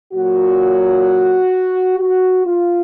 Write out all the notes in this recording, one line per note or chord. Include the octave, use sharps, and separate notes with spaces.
A#2 F#3 F#4
F#4
F4